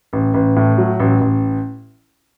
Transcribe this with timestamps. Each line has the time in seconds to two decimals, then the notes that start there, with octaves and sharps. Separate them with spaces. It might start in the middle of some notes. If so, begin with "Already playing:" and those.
0.13 A1
0.34 A1
0.56 A2
0.78 F#3
1.00 A1
1.21 A1